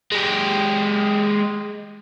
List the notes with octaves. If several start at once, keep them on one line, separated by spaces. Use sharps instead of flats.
G#3 G4